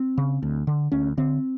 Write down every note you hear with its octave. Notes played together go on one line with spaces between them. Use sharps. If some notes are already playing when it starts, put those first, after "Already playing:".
Already playing: C4
C#3
D2
D3
D2 C#4
D3 C4